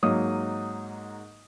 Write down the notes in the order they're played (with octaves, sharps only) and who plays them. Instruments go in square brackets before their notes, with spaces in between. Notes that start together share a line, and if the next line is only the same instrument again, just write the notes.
[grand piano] G#2 F#3 A#3 D#4 D#6